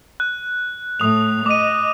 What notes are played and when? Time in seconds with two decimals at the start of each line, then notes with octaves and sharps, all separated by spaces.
0.20 F#6
1.00 A2 A3 D#6 F7
1.46 D#5 D6 D#7